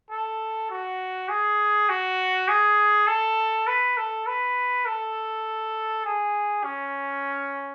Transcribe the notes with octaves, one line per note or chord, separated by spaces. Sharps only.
A4
F#4
G#4
F#4
G#4
A4
B4
A4
B4
A4
G#4
C#4